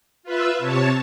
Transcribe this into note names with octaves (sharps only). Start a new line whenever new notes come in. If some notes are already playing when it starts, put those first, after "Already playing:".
F4 B4 E5
C3 C#5 A5